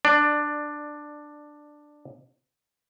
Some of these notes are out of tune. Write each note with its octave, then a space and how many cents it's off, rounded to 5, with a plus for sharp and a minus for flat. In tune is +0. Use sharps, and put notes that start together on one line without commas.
D4 +10 D5 +20